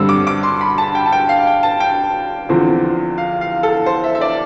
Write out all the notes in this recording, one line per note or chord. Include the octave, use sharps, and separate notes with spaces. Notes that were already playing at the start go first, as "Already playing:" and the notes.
Already playing: G2 D3 G3 C4 E6
D6
D6
C6
B5
A5
G5
A5
G5
F5
G5
A5
G5
E2 D3 F3 C4
F5
F5
A4
C5
E5
E5
D5